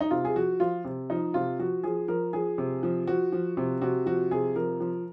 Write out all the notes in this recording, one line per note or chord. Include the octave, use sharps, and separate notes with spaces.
D#4
C3 F4
G#4
F3 F#4
F3 F4
C3
F3 D#4
C3 F4
F3 F#4
F3 G#4
F3 A#4
F3 G#4
C3
F3
F3 F#4
F3
C3
C3 F#4
F3 F#4
C3 G#4
F3 A#4
F3